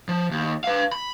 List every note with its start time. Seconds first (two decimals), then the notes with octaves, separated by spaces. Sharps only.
0.09 F3
0.31 D#2
0.64 B4 F5
0.92 B5